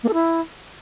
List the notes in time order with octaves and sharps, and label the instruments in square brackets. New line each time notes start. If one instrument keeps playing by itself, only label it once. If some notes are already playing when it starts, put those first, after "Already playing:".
[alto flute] A#3
A4
E4